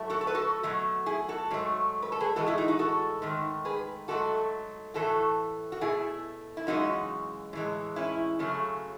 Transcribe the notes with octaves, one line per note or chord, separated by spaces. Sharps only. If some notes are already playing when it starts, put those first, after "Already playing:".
Already playing: A2 F#3 A3
F#4 A4
A4
B4
F#4 A4
B2 F#3 A3
E4 G#4
F#4 A4
G#2 F#3 A3
B4
A4
G#4 B4
A2 E3 G#3 F#4 A4
E4 G#4
D#4 F#4
D#4 F#4
F#4 A4
G#2 D#3 A3
G#4 B4
G#2 F#3 A3 F#4 A4
A2 E3 A3 F#4 A4
F#4
B2 A3 E4 G#4
E4
F#2 C#3 E3 G#3 D#4 F#4
A2 E3 G#3
C#4 E4
F#2 C#3 F#3 A3